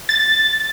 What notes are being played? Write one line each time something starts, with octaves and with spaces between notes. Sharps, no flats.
A6